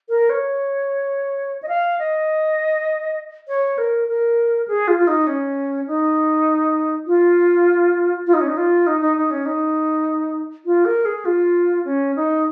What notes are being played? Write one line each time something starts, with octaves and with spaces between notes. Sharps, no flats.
A#4
C#5
D#5
F5
D#5
C#5
A#4
A#4
G#4
F4
F4
D#4
C#4
D#4
F4
F4
D#4
C#4
D#4
F4
D#4
D#4
D#4
C#4
D#4
F4
A#4
G#4
F4
C#4
D#4